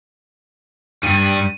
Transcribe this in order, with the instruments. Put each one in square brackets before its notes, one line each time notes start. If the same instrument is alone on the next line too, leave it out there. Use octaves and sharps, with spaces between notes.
[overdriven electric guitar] G2 G3 [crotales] D#7